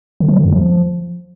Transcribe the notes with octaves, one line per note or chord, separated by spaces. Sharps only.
D3
F#3
D3
F2
F3